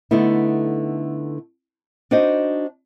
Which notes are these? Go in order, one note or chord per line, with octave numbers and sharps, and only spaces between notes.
D3 A3 B3 D#4 E4
D4 D#4 F#4 C5 D#5